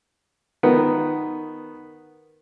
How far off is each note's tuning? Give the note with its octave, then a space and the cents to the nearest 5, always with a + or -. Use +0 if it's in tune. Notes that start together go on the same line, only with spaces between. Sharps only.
D#3 -5 B3 +0